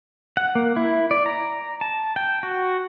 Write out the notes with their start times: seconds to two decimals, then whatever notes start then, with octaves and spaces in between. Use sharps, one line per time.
0.37 F#5
0.55 A#3
0.77 E4
1.11 D5
1.26 A#5
1.81 A5
2.16 G5
2.43 F#4